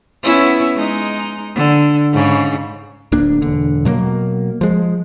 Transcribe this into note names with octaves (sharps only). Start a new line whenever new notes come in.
B3 C#4 E4
G#3 D#4
D3
G#2 C#3
D1 A#3 D4
E1 D3
B2 F#3 G#3 A#3
F3 G#3